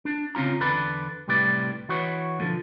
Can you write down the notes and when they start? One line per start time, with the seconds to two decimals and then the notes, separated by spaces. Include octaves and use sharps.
0.05 D4
0.35 C#3 C4 C#4 F4 A#5
0.60 E2 D3 B4 D5 B5
1.28 C2 A2 G3 B4 D5
1.89 E3 F#4 B4 C#5
2.39 B1 A2 D3 F3